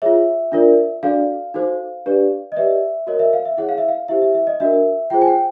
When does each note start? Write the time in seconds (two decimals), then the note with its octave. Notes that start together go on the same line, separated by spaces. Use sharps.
0.02 F4 G#4 C#5 E5
0.52 D4 F4 A#4 D5
1.03 D4 F#4 A4 D5 F5
1.54 D#4 F#4 A4 C5
2.06 D4 G4 B4 D5
2.52 D#5
2.56 G4 B4 D5 E5
3.07 F#4 A#4 C#5 D#5
3.19 E5
3.33 F5
3.45 E5
3.58 E4 G#4 C#5 F#5
3.69 F5
3.78 E5
3.88 F5
4.08 E4 G4 C5 E5
4.22 E5
4.35 E5
4.47 D#5
4.60 D4 F#4 A#4 E5
5.10 F4 G#4 C5 G5
5.22 G#5
5.27 G5